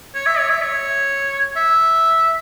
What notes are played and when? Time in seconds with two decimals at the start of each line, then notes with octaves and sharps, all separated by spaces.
0.15 C#5
0.26 E5
0.39 C#5
0.50 E5
0.62 C#5
1.56 E5